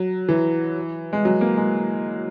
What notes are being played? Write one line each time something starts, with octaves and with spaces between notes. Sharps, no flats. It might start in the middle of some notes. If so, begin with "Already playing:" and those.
Already playing: F#3
E3
G#3
F#3
A#3
G#3